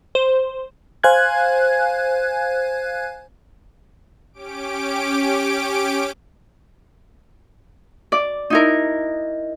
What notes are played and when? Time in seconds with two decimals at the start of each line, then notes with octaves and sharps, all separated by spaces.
0.15 C5
1.03 C5 F5 G#5 F#6 G#6
4.33 C#4 G4 D6 D7
8.12 D5
8.50 D#4 E4 A#4